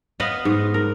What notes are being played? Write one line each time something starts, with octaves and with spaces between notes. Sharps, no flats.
B3 B4 D#5 F5
G#2
A#4